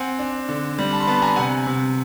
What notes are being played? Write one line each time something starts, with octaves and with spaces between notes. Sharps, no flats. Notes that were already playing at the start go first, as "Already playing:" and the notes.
Already playing: C4 F#5 G#5
D4
D3
G3
A5 B5
C6
B3 A5 B5
G#5 A#5
C3 F#5 G#5
C3